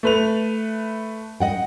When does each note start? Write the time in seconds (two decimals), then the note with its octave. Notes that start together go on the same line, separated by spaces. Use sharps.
0.03 A3 B4 F7
1.40 D#5 F#5 G5